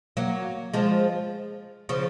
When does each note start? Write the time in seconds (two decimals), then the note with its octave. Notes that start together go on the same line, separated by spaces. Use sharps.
0.17 F#3 A#3
0.74 F3 G#3
1.89 C#3 F3